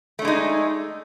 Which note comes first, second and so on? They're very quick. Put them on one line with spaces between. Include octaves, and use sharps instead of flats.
A3 D4 G#3 D#4